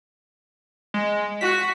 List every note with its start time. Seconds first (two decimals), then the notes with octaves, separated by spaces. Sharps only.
0.94 G#3
1.41 F#4 B6